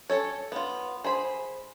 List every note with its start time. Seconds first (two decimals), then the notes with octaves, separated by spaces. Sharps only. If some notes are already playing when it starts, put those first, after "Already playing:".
0.10 C#4 A4 C#5
0.52 B3 F4
1.04 G#4 C5 B5